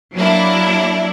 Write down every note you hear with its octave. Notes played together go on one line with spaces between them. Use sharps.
F#3 A#3 D4 E4